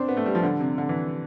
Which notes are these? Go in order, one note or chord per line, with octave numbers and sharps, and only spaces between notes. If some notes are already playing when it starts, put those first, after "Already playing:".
Already playing: C4 D4
B3
A3
G3
F3
D3
C3
D3
E3